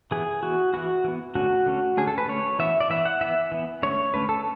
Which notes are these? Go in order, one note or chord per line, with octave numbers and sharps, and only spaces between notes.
E3 B3 G#4
E3 B3 F#4
E3 B3 F#4
E3 B3
D3 A3 C#4 F#4
D3 A3 C#4
D3 A3 C#4 G#4
A4
B4
D3 A3 C#4 C#5
E3 B3 E5
D5
E3 B3 E5
F#5
E3 B3 E5
E3 B3
D3 A3 C#4 C#5
D3 A3 C#4 B4
A4